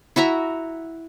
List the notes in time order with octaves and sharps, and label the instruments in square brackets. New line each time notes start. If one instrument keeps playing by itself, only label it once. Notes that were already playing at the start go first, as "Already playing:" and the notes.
[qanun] E4 F#4 E5 A#5